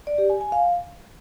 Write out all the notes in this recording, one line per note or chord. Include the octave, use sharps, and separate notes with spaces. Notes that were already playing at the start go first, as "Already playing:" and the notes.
D5
G4
G#5
G#5
F5